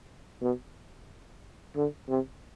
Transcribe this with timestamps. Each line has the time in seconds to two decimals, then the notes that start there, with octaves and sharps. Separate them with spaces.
0.41 B2
1.76 D3
2.09 C3